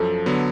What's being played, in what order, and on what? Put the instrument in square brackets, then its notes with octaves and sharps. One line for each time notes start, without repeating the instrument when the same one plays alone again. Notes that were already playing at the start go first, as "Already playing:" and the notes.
Already playing: [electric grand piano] F#2 F3 [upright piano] A4
[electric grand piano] D3 F#3 B3